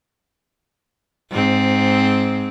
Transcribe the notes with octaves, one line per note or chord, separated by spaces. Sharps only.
G#2 C4